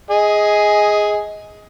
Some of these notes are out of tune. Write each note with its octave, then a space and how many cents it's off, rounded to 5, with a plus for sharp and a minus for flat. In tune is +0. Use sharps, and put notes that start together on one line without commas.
G#4 +0 D#5 +20 G#5 +0